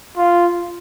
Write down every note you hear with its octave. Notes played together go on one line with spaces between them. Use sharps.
F4